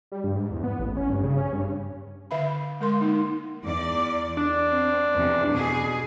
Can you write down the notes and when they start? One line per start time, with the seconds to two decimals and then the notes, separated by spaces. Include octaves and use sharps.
0.12 G3
0.24 G2
0.35 G#2
0.51 E2
0.64 B3
0.80 A1
0.97 C#4
1.10 G2
1.23 C#3
1.37 C#4
1.53 G2
2.31 D3 E5 F5 B5
2.81 G#3 A#4 C6
3.01 A#3 D#4
3.63 E2 D5
4.37 D4
4.70 C4
5.15 E2 C3
5.51 B2 G#4